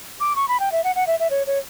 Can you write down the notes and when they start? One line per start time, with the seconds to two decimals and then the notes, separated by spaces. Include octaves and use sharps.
0.20 D6
0.36 C#6
0.48 B5
0.60 G5
0.72 E5
0.84 F#5
0.95 F#5
1.07 E5
1.19 E5
1.30 C#5
1.47 C#5